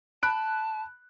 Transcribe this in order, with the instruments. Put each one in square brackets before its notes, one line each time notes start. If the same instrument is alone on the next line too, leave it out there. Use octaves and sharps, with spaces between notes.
[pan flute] A5 [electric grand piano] B5 F#6 D7